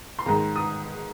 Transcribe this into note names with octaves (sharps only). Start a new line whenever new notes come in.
C6
G#2 D#3 A#5
D#6